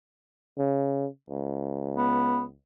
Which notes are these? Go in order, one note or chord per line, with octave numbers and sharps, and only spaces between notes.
C#3
C#2
B3